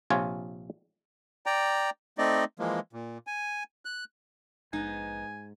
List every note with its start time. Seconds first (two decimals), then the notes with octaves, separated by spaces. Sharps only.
0.10 A#1 C3 F4 C#5 G#5
1.46 D5 G5 A#5
2.18 A3 C4 D#4 D5 D#5
2.59 E3 F3 G#3 A#3
2.93 A#2
3.27 G#5
3.85 F#6
4.73 A#1 G#2 B3 D#4 G#5